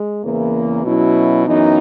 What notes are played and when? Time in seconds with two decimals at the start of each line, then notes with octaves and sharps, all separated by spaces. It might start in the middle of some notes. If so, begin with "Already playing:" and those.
Already playing: G#3
0.24 E2 C#3 E3 A#3
0.85 B2 F#3 C#4 E4
1.46 F#2 E3 B3 D#4